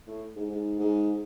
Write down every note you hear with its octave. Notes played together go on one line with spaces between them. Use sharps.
A2
G#2
G#2
G#2